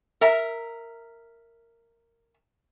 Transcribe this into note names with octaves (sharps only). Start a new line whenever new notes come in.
A#4 E5 A#5